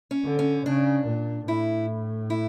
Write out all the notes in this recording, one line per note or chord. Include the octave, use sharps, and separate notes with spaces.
C#4
D3
C#4
C#3 D4
A#2
A2 E4
E4